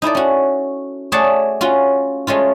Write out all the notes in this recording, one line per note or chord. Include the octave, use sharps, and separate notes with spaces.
D#4 E4 A4 D5
C#4 F#4
A3 G#4 C#5 D5 F#5 A5
C#4 F4 F#4
G#3 A3 C#4 F4